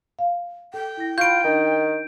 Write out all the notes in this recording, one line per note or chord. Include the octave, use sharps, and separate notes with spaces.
F5
A4 G5
E4 A#6
F4 B5 C#6 G6 D7
D#3 D4 D#4